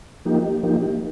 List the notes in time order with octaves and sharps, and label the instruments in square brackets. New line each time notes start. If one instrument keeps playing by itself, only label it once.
[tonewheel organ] F3 A#3 D#4 G4
F3 A#3 D#4 G4